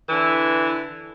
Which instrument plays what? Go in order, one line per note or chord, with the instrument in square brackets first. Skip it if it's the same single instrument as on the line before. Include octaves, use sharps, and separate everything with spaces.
[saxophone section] D3 E3 E4